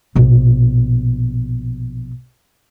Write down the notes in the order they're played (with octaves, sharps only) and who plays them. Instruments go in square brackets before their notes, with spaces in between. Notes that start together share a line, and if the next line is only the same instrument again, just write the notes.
[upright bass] A#1 B2